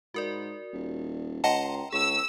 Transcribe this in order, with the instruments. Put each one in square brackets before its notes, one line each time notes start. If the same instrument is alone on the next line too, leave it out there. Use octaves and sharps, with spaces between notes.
[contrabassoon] G#2 [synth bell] F#4 A#4 D5
[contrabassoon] D#1
[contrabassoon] C#2 [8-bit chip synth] D#5 F#5 A5 [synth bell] G5 A#5 C6
[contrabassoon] C#2 [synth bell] G#4 [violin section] E6